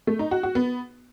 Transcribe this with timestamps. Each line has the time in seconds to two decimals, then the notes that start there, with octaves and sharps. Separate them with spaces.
0.07 A3
0.19 D#4
0.31 F#4
0.43 F#4
0.55 B3